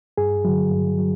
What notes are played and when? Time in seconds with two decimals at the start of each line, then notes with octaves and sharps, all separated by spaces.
0.18 G2 G#4
0.45 D3 F#3
0.71 G2
0.99 F#3